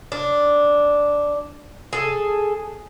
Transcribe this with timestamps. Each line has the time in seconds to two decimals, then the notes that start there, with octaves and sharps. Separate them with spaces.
0.12 D4
1.93 G#4 A4